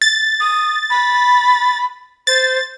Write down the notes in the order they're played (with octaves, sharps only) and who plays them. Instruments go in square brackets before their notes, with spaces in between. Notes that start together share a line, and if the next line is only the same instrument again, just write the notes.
[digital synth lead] A6
[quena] D#6
B5
[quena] C5 [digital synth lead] A6